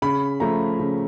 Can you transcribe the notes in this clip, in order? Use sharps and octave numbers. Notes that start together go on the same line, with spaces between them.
C#3 B5
F3 A3 A#5
C#3